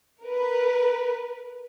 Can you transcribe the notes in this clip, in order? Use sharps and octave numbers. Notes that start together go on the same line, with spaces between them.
A#4 B4